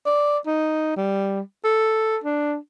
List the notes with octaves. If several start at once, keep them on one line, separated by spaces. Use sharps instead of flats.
D5
D#4
G3
A4
D4